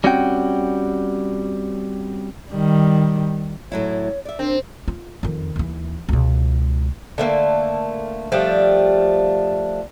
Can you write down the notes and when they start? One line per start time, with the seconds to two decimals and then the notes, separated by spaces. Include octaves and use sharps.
0.04 G3 C4 C#4 F#4 F#5 G5
2.51 D#3 G3
3.72 A2 F#3 E4 C#5
4.25 D5 E5
4.39 C4 D4 A#4
4.88 F4
5.23 F2 D#3
5.56 D#2 E3
6.09 C#2 B2
7.18 D3 A3 A#3
8.32 F3 G3 A3 D4